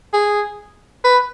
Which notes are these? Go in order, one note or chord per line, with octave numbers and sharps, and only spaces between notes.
G#4
B4